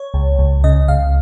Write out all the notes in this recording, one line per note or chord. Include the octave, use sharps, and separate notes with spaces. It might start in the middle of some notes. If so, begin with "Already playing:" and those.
Already playing: C#5
C#2
C#2
C#3 D#5
C#2 F5